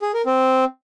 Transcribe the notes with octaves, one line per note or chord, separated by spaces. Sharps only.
G#4
A#4
C4